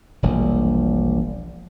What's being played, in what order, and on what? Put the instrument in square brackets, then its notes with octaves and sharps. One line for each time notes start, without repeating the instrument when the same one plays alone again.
[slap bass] E1 A#1 G3